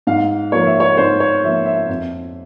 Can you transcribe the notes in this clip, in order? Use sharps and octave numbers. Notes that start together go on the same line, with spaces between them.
G#2 F5
F3 A#3 C#5
E5
C#5
G#2 C5
C#5
F3 A#3 E5
E5
F2